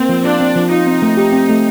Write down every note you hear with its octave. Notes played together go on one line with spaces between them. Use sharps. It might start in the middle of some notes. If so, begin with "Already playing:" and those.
Already playing: A#3 C4
F3
D4 F4
C4
F3
D#4 F4
C4
A3
G4
C4
A3